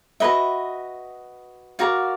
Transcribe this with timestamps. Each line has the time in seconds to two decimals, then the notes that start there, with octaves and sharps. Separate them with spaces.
0.20 F#4 B4 D#5 E5
1.79 F#4 A#4 D5 F5